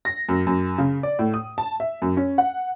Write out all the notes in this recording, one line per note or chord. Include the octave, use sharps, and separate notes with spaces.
A#6
F#2
F#2
C#3
D5
A2
D#6
A5
E5
F#2
C#4
F#5